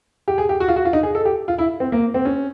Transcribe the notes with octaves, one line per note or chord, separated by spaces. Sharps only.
G4
G#4
G4
F#4
F4
F#4
F4
D#4
G#4
A4
G4
F4
E4
C4
A#3
C4
C#4